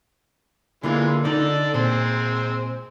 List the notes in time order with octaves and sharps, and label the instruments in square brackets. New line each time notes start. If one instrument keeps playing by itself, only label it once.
[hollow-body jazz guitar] D3 A#3 F4 [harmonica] E3 G#3
[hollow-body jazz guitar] D3 D#4 [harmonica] A4 D5
[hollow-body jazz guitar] A#2 [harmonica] G#3 C4